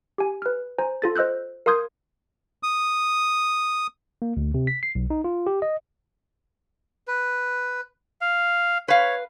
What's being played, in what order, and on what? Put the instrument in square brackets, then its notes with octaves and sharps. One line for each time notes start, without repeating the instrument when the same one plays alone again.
[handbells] G4 G#5
B4 F6
C5 G#5 A#5
F4 A4 A6
C5 D#5 E6 F#6 G6
A#4 F5 C6 D#6 G6 G#6
[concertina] D#6
[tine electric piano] A#3
D2
C3
B6
C7
B1
D#4
F4
G4
D#5
[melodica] B4
F5
[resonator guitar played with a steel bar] B4 F5 [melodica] C#5